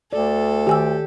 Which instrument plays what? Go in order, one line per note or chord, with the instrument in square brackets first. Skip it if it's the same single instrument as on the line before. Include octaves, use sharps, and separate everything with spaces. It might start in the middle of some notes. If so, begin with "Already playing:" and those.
[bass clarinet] D2 [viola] A4 [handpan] D5
[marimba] D#3 G#5 E6 [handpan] G4